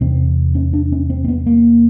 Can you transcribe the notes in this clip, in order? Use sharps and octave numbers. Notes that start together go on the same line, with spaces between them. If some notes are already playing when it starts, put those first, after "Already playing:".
E2 C3 C4
C#4
D4
C#4
C4
C4
B3
A#3